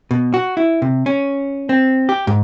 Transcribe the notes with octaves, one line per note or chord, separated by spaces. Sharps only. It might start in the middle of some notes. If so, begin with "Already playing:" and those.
B2
F#4
E4
C3
C#4
C4
G4
G#2